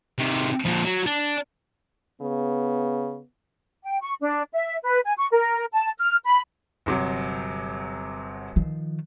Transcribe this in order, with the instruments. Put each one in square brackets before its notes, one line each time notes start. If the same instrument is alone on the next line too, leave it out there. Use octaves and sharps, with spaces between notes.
[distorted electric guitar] C3 D#3
F2 A#2
F#3
D4
[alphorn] C#3 [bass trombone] B3
[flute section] G5
C#6
D4
E5
B4
G#5
C#6
A#4
A5
F6
B5
[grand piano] G1 C3 F#3
[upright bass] D#3 F3